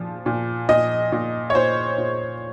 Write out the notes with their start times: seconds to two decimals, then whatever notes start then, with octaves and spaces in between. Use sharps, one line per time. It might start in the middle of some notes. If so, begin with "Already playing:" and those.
Already playing: A#2 F3
0.26 A#2
0.69 A#2 D#5
1.12 A#2
1.50 C#5
1.55 A#2 C5
1.98 A#2